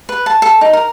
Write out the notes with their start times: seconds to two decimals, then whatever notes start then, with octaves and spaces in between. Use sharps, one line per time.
0.09 B4
0.26 A5
0.42 A4
0.61 D#4
0.73 A#4